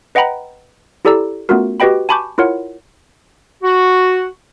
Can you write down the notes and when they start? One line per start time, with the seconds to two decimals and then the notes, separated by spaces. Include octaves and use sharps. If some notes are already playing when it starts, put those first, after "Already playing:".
0.15 B4 D#5 F#5 G5 A#5 B5
1.05 E4 G4 A4 D5 A#5 E6
1.49 A3 B3 C#4 F4 F#4 A#4
1.80 F#4 G4 B4 D#5 G5 B5
2.09 G#5 A5 B5 C#6 D6 G6
2.38 E4 F4 A#4 C#5 F#5
3.63 F#4